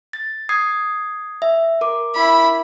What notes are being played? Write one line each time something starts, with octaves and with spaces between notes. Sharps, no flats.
A6
D#6 G#6 C7
E5
A#4 D6
E4 B5